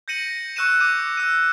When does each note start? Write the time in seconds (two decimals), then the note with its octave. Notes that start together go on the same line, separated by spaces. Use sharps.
0.08 G6 A#6 C#7 D#7 F#7
0.56 C#6 E6 F#6 C#7 D#7 E7
0.80 D6 G6 D#7
1.17 E6 D#7